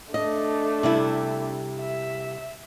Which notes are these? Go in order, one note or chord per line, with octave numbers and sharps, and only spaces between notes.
A3 D4 D#5
C3 G3 E4
E5